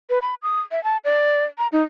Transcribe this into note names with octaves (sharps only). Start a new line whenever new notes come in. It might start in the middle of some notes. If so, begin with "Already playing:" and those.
B4
B5
D#6
E5
A5
D5
A#5
D#4